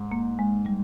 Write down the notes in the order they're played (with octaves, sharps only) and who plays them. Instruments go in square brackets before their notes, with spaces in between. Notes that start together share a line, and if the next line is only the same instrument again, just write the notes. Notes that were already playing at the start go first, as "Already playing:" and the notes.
Already playing: [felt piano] G#2
[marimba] A#3
G#3
G3